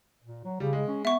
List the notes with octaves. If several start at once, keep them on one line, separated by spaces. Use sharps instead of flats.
A#2
F#3
C#3 G3
G#3
C#4
B3 E5 C#6